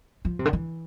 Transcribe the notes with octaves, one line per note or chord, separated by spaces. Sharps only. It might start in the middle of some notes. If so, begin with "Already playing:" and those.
F3
C3
D3
E3